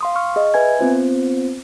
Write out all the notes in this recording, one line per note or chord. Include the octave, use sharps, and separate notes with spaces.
F5 C6 D#6
C#6 F6
G#4 D#5
B4 E5 G#5 G#6
B3 C4 F4 C5